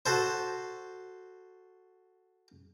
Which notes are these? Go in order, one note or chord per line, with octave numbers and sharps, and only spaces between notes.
F#4 A4 C5